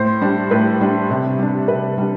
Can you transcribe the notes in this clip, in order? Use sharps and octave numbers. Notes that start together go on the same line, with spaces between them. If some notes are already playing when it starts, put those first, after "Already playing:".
Already playing: A2 C5
G3 D4
A2 B4
G3 D4
C3
G3 D4
C3 B4
G3 D4